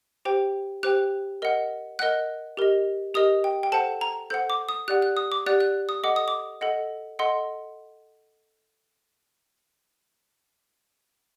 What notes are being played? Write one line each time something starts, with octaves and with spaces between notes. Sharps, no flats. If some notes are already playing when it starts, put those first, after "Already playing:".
G4 C5 G5
G4 C5 G5 F#6
A#4 D#5 F#5
A#4 D#5 F#5 F#6
G4 A#4 D#5
G4 A#4 D#5 D#6
G5
G5
A4 C5 F#5 A5
A#5
A4 C5 F#5 G6
D6
D#6
G4 D5 F#5 F#6
F#6
D#6
D6
G4 D5 F#5 F#6
F#6
D#6
A4 D#5 F#5 D6
D#6
D6
A4 D#5 F#5
A4 D#5 F#5 C6